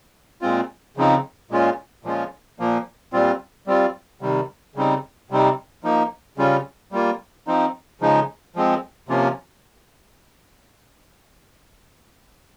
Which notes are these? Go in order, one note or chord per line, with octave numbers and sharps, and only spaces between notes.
A#2 G#3 C4 F4
C#3 F3 C4 D#4
A#2 G#3 C#4 F4
A#2 F3 G#3 C#4 F4
A#2 F3 A#3
A#2 G3 C4 F4
G3 C4 F4
C3 D#3 G3
C#3 G3 C4 D#4
C3 G3 C4 D#4
F3 A#3 D#4
C#3 G3 C#4 F4
G3 A#3 F4
F3 C4 D#4
C#3 F3 G#3 D#4
F3 G#3 C4
C3 F3 A#3 C#4 F4